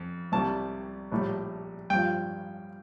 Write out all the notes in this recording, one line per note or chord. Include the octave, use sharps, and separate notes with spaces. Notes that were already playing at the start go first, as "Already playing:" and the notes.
Already playing: F2
C2 C3 G3 A5
A#1 A2 G3
G2 F3 G5